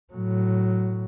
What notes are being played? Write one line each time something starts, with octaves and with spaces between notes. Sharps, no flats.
A2 F#3